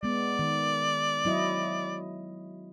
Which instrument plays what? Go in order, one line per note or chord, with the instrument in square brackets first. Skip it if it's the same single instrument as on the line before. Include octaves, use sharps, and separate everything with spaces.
[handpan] G#3 B3 [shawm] D5
[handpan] D#3
F#3 E4 D#5